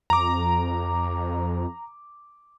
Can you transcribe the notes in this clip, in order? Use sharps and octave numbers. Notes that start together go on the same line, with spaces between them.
F2 A#5 D6